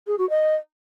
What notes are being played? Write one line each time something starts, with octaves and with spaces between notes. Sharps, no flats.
G#4
F#4
D#5